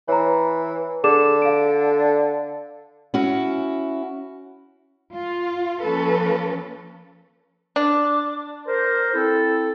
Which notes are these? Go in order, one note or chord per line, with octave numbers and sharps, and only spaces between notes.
E3 C#5 A#5
D3 G#4 D6 E7
F5 D7
C#4 E4 F#4
F4
F3 A#3 C#4 A4 B4
D4
A#4 C5
C4 E4 A4